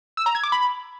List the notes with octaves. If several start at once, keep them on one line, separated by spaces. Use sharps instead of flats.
E6
A#5
G#6
D6
B5